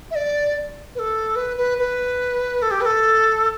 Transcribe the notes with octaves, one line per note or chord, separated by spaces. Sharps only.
E5
D5
B4
A4
B4
B4
B4
A4
G4
B4
A4